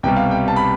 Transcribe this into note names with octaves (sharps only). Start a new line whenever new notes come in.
C2 B2 G3 G5
F5
G5
A5
B5